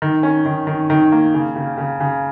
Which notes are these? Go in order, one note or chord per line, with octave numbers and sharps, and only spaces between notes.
D#3
C#4
D#3
D#3
D#3
A#3
C#3
C#3
C#3
C#3